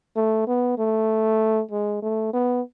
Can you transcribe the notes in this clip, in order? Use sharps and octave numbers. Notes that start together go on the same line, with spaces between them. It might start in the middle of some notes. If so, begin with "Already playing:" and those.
A3
B3
A3
G#3
A3
B3